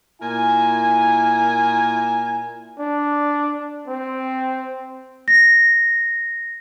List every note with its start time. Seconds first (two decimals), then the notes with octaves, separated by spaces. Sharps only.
0.22 A#2 E4 A#4 G#5
2.79 D4
3.88 C4
5.28 A#6